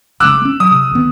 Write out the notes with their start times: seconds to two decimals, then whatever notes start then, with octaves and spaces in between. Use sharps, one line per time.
0.20 F1 C#3 G#3 D6 E6 F#6
0.41 A#3 C#4
0.60 F#3 D#6
0.71 C3
0.91 D2 D#3 B3